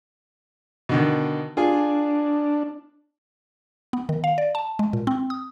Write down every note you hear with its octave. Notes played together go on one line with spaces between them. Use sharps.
B2 D3 D#3
D4 F4 G#4
B3
D#3
F5
D5
A5
G#3
A#2
C4
D#6